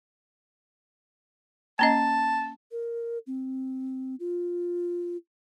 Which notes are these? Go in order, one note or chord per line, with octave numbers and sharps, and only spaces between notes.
A#3 C#4 D#5 A5
A#4
C4
F4